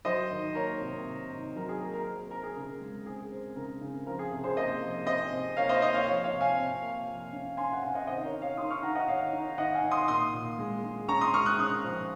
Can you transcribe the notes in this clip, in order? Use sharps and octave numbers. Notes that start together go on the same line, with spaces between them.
F#3 C5 D#5
D#3
A#3 A#4 C#5
C3
C3
D#3
F#3 A#4
G#4
A#3 A#4
A#4
C4 A#4
C4 A#4
G#4
C#3 A#4
G#3
C4 G#4
C4
C#3 A#4
C#3
F3 A#4
G#4
C3
G#4 C5
A#3 C5 D#5
F3
C3 C5 D#5
C3
A#3 C#5 F5
C5 D#5
A#3 C5 D#5
C#5 F5
F3 C#5 F5
C#5 F5
C3
F5 G#5
C3
A#3
F3
C#4
C#4 G#5 C6
F#5
C3 F5 G#5
D#5 F#5
D#3 C5 D#5
A#4 C#5
D#4
C#5 F5
D#4 C6 D#6
C#6 F6
D#4 F#5 A#5
D#5 F#5
D#3 C#5 F5
D#4
D#3 D#5 F#5
F5 G#5
D#3
C6 D#6
A#2 C6 D#6
A#2
G#3
G#3
C#4 A#5 C#6
C6 D#6
G#3 C#6 F6
D#6 F#6
C#4 D#6 F#6
F3